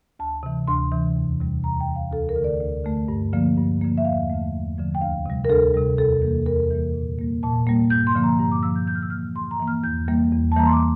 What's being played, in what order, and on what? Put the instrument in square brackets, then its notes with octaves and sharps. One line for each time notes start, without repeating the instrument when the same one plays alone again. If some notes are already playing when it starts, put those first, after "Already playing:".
[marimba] D2 A5
C3 E3
D2 C6
C3 E3
E2
C3 G3
E2 A#5
G5
C3 G3
F5
D2 A4
A#4
D3 A3
D5
D2
D3 A3
G2
D3 F3 A#3
G2
D3 F3 A#3
E5
E2 F5
D3 F3 A3
E2
D3 F3 A3
G5
D2 F5
C3 G3
A#4
D2 A4
C3 G3
E2 A4
E3 G3 A#3
A4
E2 A#4
E3 G3 A#3
A#2
G3 A#3
A#2 A5
G3 A#3
G2 G6
C6
D3 F3 A#3
A#5
G2 A#5
D6
D3 F3 A#3 E6
G6
G2 G6
F6
E6
E3 A#3 F6
G2 C6
A#5
E3 A#3
F6
E2 G6
E3 G3 A#3
E2
A5
E3 G3 A#3 A#5
C6
D6